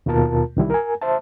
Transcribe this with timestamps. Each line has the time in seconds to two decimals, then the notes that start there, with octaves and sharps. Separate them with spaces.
0.06 D#2 B2 F4 A#4 A5
0.56 C2 D#3 G3 E4
0.70 A#4 G#5
1.01 C5 E5 A5